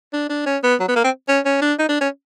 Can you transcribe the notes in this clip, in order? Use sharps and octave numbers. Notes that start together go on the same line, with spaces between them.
D4
D4
C#4
B3
F#3
B3
A#3
C4
C#4
C#4
D4
D#4
D4
C#4